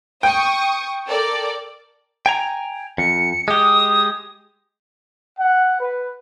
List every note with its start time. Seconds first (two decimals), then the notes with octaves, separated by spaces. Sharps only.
0.23 G5 C#6 D#6
1.10 A4 A#4 D5
2.26 G5 G#5 A#5
2.98 F2 C#7
3.48 G#3 G4 D#6
5.38 F#5
5.81 B4